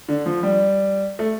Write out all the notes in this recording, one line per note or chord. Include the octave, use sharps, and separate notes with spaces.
D3
F3
G3
A3